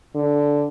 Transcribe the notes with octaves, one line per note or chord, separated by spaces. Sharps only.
D3